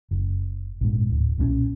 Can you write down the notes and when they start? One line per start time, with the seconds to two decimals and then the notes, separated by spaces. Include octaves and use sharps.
0.11 F#1
0.81 A#1 G#2
1.10 D1
1.38 B1 A#2 F#3 C#4